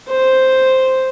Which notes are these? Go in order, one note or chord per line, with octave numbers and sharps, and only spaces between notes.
C5